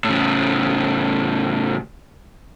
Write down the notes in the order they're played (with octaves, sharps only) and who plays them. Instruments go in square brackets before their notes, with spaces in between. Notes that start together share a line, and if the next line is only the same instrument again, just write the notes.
[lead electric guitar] A2 C#3